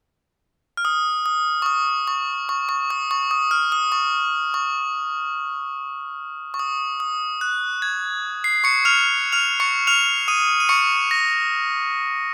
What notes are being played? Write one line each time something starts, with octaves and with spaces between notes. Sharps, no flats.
F6
D#6
D#6
C#6
D#6
C#6
C#6
C#6
D#6
C#6
D#6
F6
D#6
C#6
C#6
C#6
D#6
D#6
F#6
G#6
C7
C#6 C#7
F6 F7
F6 F7
C#6 C#7
F6 F7
D#6 D#7
D#7
C#6 C#7
A#6